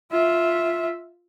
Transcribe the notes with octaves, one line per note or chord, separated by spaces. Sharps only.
F4 E5